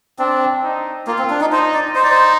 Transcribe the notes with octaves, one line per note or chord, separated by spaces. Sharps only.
C4 D4
D#4
A#3 F4
C4
D4
D#4
D#4 C5
D5
D#4 C5
D5
C5